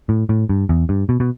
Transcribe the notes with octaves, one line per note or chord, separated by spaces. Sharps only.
A2
A2
G2
E2
G2
B2
B2